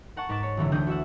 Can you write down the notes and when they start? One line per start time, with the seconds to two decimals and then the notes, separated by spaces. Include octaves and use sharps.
0.16 A#4 F#5 A5 C#6
0.29 G#2 A#4 B4 D6 A6 E7
0.43 C#5
0.57 D#1 C2 D3 E3
0.72 D2 E3 D4 D#6 G6
0.87 F#4 E5 F#5